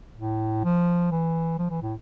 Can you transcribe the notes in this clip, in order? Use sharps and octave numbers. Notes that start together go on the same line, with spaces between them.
A2
F3
E3
F3
E3
A2